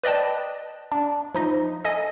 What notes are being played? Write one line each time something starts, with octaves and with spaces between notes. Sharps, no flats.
B4 D5 D#5 G5 A5
D4
F3 D#4 D#5
A4 D#5 G#5